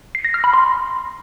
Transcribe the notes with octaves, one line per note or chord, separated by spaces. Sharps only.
C7
A#6
F6
B5
C6